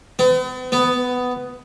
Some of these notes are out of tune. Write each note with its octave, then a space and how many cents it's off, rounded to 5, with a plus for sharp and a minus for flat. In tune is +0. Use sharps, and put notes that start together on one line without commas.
B3 +45
B3 +10